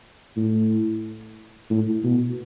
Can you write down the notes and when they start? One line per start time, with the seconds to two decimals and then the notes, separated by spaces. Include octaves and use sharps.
0.37 A2
1.70 A2
2.04 B2